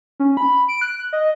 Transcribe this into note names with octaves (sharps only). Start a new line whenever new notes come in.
C#4
B5
D7
F#6
D#5